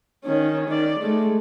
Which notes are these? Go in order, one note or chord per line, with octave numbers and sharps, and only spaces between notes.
D#3 C#4
D#3 D5
G#3 A3